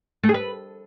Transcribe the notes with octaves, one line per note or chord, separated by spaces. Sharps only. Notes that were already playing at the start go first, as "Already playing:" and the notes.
A3
G#4
B4